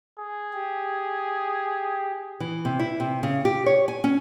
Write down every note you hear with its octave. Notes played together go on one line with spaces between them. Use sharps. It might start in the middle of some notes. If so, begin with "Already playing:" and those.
G#4
G4
E3
C3
E4
C3
C#3
G4
C#5
G#5
C#4